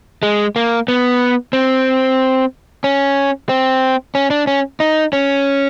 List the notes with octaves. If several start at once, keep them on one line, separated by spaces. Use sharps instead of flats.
G#3
A#3
B3
C4
C#4
C4
C#4
D4
C#4
D#4
C#4